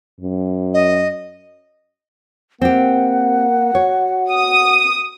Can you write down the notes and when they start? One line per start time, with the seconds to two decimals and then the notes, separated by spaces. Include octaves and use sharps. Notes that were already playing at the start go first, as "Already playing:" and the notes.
0.20 F#2
0.74 D#5
2.61 A#3 C4 G4 F#5
3.75 F#4 C#5
4.30 D#6